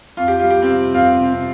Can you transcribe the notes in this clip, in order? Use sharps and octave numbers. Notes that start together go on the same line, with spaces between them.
F2 F4
G4
G3 F4
G4
C4 F4
C3
F1 C4 F4
C3
C4